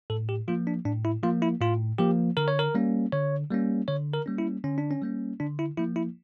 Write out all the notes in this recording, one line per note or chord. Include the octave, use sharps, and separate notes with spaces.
A2 A4
G4
F3 A#3 F4
D4
A2 D4
E4
F3 A#3 F4
E4
A2 F4
F3 A#3 G4
D3 A#4
C#5
A#4
G3 A#3 C#4
D3 C#5
G3 A#3 C#4
D3 C#5
A#4
G3 A#3 C#4
E4
D3 C#4
D4
C#4
G3 A#3 C#4
D3 D4
E4
F3 A#3 E4
E4